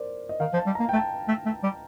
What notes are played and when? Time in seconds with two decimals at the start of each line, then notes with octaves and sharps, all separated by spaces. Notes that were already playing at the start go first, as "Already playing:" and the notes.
Already playing: A#4 C5 D5
0.29 D#5
0.40 D#3 F5
0.53 F3
0.58 A5
0.66 G3
0.75 A#3 A#5
0.89 G5
0.93 A3 A5
1.28 A3
1.45 A3
1.63 G3